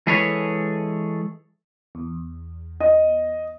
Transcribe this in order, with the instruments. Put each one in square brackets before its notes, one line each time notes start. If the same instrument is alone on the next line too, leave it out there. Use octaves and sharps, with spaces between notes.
[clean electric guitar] E3 G#3 G#4 A4 B4 C#5
[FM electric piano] E2
[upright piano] D#5